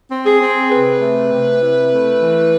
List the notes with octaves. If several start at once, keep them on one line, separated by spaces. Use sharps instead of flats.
C4
G#4
C4
C3 B4
A3
C3
E4
A3
E3